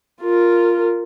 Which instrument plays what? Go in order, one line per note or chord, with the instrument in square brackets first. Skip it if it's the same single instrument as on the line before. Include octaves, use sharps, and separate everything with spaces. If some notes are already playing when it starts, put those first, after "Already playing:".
[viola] F4 A#4